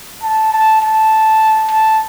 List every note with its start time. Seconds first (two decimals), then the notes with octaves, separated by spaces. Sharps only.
0.23 A5
0.52 A5
0.82 A5
1.71 A5